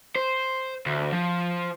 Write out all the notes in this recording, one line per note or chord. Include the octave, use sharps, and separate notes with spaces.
C5
D2
F3